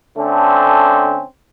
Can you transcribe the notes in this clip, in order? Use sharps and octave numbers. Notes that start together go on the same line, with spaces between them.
D3 A3 C4 C#4